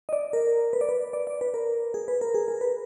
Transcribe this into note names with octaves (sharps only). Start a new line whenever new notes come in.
D#5
D5
A#4
B4
D5
B4
D5
D5
B4
A#4
G#4
B4
A#4
G#4
A#4
B4